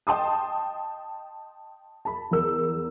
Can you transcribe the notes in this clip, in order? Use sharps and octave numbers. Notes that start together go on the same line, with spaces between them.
D#5 G5 A5 C6 D#6
A5 B5
E2 A#4 E6